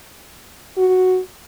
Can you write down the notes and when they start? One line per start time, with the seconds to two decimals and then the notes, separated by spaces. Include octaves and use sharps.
0.78 F#4